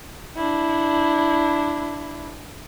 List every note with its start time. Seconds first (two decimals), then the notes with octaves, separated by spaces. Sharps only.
0.36 D4 E4